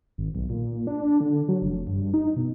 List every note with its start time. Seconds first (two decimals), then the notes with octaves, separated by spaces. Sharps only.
0.18 G#1
0.35 B1
0.49 A#2
0.87 D4
1.21 D3
1.49 F#3
1.62 F1
1.87 G2
2.14 D#4
2.37 B2